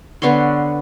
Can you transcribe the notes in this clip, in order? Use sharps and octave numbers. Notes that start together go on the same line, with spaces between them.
D3 B3 C#5 C6